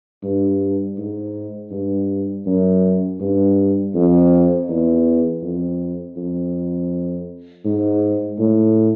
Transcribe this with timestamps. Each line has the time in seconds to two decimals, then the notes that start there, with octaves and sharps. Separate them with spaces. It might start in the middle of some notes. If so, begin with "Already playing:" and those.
0.24 G2
0.98 G#2
1.72 G2
2.46 F#2
3.20 G2
3.95 F2
4.69 E2
5.42 F2
6.17 F2
7.65 G#2
8.39 A2